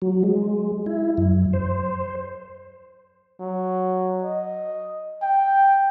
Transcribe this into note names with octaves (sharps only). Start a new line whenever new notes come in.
F#3
G#3
E4
F#2
C5
F#3
D#5
G5